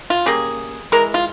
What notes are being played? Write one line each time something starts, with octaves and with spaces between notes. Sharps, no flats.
F4
C#3 G3 A#3 G#4
E3 G#3 A#4
F4